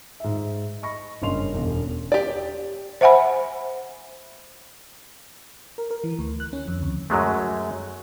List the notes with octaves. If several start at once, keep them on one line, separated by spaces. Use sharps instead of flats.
G#2 E5
D#5 B5 C#6 A#6
F#1 G2 C#4 D#5 C6 F7
E1 D3
G4 D5
C5 E5 F#5 G#5 B5
A#4
A#4
E3
D2
F#6
C#4
F2
D2
F#2 F#3 G#3 A3